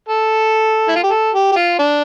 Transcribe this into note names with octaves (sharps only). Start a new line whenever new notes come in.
A4
E4
F4
G4
A4
G4
G4
F4
D4